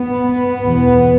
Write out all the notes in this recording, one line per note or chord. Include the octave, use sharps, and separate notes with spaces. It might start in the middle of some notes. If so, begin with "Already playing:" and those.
Already playing: B3
E2 B2